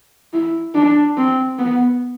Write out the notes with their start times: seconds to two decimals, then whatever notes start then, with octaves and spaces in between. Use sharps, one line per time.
0.33 E4
0.75 D4
1.17 C4
1.59 B3